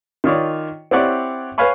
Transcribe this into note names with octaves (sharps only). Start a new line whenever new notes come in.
D#3 F4 C#5 D5
C4 E4 G4 C#5 D5 F#5
B4 C#5 F5 G#5 B5 C#6